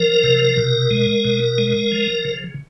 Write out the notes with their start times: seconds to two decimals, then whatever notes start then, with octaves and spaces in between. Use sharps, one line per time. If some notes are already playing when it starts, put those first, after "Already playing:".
Already playing: F3 A#4
0.24 C3
0.57 B2
0.91 G#3
1.25 B2
1.58 G#3
1.92 F3
2.25 C#3